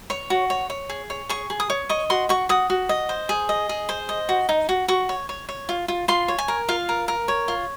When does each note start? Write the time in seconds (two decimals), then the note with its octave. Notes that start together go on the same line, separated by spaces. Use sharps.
0.10 C#5 C#6
0.30 F#4
0.50 C#5
0.70 C#5
0.90 G#4
1.10 C#5
1.29 G#4 C#6
1.50 G#4
1.60 D#6
1.70 C#5
1.89 D#5 C#6
2.10 F#4 C6
2.29 F#4 C#6
2.49 F#4 D#6
2.70 F#4
2.89 D#5
3.09 C5
3.29 G#4
3.49 D#5
3.69 G#4
3.89 C5
4.09 D#5
4.29 F#4
4.49 D#4
4.69 F#4
4.88 F#4 C#6
5.09 C#5
5.29 C#5
5.49 C#5
5.69 F4
5.88 F4
6.08 F4 C6
6.28 C#5
6.39 G#5
6.48 A#4
6.68 F4 F5
6.89 A#4
7.08 A#4
7.28 C#5
7.48 F4